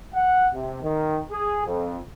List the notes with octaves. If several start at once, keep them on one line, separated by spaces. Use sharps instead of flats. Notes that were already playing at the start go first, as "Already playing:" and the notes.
F#5
C3
D#3
G#4
F2